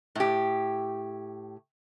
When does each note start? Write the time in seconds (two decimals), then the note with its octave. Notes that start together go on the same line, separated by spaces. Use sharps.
0.15 A2 G4